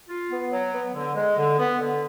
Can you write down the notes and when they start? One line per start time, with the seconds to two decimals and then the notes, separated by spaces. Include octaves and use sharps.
0.09 F4
0.30 B3
0.51 F#3
0.73 B3
0.94 D3
1.15 G#3
1.37 D3
1.58 B3
1.79 D3